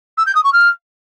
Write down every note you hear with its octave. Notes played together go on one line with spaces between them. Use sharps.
E6
G6
D#6
C#6
F6